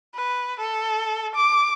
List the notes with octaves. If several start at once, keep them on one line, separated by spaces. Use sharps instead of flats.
B4
A4
D6